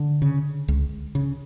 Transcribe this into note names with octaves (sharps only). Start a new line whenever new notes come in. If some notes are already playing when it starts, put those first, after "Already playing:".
Already playing: D3
C#3
C#2
C#3